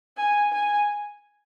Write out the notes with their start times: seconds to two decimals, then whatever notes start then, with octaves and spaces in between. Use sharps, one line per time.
0.17 G#5
0.52 G#5